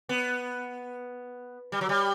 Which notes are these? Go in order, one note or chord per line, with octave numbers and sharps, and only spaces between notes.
B3
G3
F#3
G3